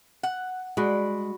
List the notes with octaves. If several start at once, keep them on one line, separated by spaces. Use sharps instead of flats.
F#5
G3 G#3 D4 F#4 B5 D7